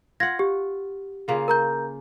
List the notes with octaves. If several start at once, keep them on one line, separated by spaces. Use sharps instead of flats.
F4 F#5 G#6 A#6
G4
C#3 A#3 F4
A#4 A#5 G6